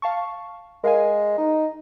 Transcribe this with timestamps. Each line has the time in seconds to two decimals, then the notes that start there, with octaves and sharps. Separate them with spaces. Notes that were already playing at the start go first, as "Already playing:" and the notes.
0.02 F5 A5 C#6
0.84 G#3 A#4 F5 G#5
1.38 D#4